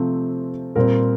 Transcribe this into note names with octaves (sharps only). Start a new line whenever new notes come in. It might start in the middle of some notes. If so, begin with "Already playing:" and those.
Already playing: C3 F3 A3 C4
A#2 G3 C4 A#4